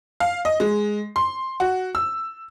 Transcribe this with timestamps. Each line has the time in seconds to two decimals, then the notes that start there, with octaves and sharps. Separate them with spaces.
0.20 F5
0.45 D#5
0.60 G#3
1.16 C6
1.60 F#4
1.95 E6